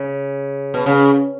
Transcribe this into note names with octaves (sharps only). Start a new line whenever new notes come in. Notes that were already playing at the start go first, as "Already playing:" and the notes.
Already playing: C#3
B2
C#3